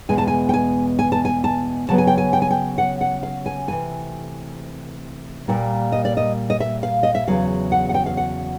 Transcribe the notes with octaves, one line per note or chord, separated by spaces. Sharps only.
E2 B2 G#3 G#5
A5
G#5
G5
G#5
G#5
A5
G#5
A5
C#3 F#3 B3 A5
G#5
G5
G#5
G5
G#5
G5
F#5
F#5
F5
G#5
C3 E3 A3 G#5
A#2 G3 A#3
D#5
D5
D#5
D#5
E5
F5
D#5
E5
E2 C#3 F#3 F5
F#5
F#5
G5
F5
F#5